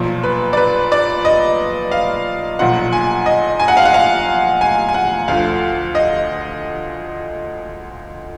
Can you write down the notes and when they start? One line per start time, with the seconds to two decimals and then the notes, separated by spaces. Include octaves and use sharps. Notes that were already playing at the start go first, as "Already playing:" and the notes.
Already playing: B1 A#2 F3
0.23 B4
0.53 D5
0.57 B4
0.92 D5
1.25 D#5
1.91 F5
2.59 B1 A#2 F3 F#5
2.93 G#5
3.26 D#5
3.60 G#5
3.68 F#5
3.77 F5
3.85 F#5
3.94 F5
4.61 G#5
4.89 G#5
4.94 F#5
5.28 D2 D3 F3 F5
5.95 D#5